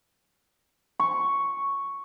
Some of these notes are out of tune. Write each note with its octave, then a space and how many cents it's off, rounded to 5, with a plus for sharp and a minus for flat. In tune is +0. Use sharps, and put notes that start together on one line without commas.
C#6 +0